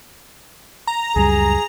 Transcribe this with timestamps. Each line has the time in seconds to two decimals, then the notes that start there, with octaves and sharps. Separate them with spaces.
0.87 A#5
1.16 C#2 F#2 G3 G#4